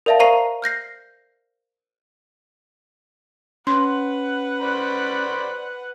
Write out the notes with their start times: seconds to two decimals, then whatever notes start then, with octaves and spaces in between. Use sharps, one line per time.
0.06 A#4 D5 E5 F5 A5
0.20 A#4 C5 F5 A#5 C#6 C7
0.62 F6 G6 A#6 C7
3.67 C#4 B4 F#5 C6
4.61 C5 D5 B5